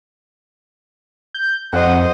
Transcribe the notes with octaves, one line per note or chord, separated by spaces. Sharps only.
G6
F2 C5 D#5 F#5